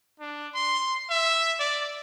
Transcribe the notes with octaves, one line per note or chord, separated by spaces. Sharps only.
D4
C6
E5
D5